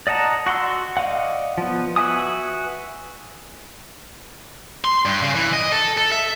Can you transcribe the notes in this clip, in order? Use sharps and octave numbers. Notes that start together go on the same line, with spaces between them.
D5 D#5 F#5 A5 A#5
F#4 F#5 C6 E6
D5 D#5 F5 F#5
F3 B3
F#4 B4 E5 G#5 D#6
C6
G2
C#3
E3
D#5
A4
A4
E5